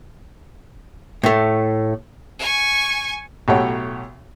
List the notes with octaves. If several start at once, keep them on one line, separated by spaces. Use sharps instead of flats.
A2 A3
G#5 C#6
B1 A2 F#4 G4 A4 C#5